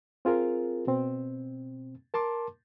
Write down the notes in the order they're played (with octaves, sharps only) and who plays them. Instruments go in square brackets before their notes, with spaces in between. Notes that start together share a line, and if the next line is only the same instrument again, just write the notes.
[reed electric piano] C4 F4 G#4 A#4
B2 C4
A#4 A5 C6 D6